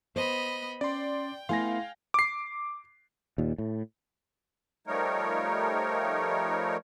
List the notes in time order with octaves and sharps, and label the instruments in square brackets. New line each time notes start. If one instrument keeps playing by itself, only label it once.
[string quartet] B3 D#5 B5 [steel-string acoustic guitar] C5
[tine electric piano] C#4 [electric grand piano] D5 C6 [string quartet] G5
[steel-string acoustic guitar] A3 B3 [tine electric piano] E4 C6 [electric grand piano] F5 G#5 A#6
[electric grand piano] D6 C7
[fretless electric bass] D#2 A#2
A2
[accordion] F3 G3 A3 D#4 A#4 C#5